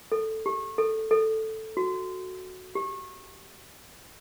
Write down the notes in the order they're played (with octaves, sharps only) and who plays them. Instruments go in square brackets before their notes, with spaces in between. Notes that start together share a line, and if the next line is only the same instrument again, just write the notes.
[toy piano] A4
G4
A4
A4
F#4
G4